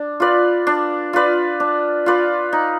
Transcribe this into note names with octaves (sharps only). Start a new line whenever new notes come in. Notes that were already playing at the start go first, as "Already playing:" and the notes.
Already playing: D4
F4 B4 D5
D4
F4 B4 D5
D4
F4 B4 D5
D#4